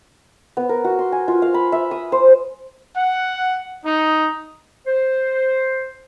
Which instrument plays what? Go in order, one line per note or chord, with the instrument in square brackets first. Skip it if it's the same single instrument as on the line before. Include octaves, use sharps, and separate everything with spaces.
[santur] B3
A#4
F#4
C6
G#5
F4
F5
B5
E5
D#6
C5
[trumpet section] F#5
D#4
[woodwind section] C5